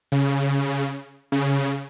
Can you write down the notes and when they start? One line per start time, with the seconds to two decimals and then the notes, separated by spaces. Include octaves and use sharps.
0.12 C#3
1.32 C#3